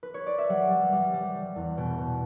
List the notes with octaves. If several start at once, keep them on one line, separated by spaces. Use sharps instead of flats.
B4
C#5
D5
E5
G3 F#5
G3
G3
G3
G3
E2
B2 G5
B2